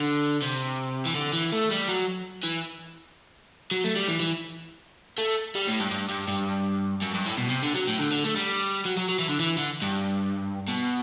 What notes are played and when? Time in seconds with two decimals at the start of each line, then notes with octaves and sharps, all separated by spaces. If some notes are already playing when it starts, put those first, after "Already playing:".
Already playing: D3
0.43 C3
1.05 E3
1.15 D3
1.33 E3
1.52 A3
1.71 G3
1.88 F#3
2.44 E3
3.71 F#3
3.84 A3
3.96 G3
4.08 E3
4.20 E3
5.18 A3
5.55 G3
5.68 A2
5.80 G2
5.91 G2
6.09 G2
6.28 G2
7.02 F#2
7.14 G2
7.26 A2
7.38 B2
7.50 C3
7.63 D3
7.75 F#3
7.87 A2
7.99 D3
8.11 D3
8.24 A3
8.36 G3
8.85 F#3
8.97 F#3
9.09 F#3
9.19 E3
9.29 D3
9.40 E3
9.58 D3
9.82 G2
10.68 B2